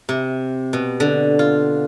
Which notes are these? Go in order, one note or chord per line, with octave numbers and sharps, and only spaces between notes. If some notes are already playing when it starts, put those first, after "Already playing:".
C3
B2
D3
F4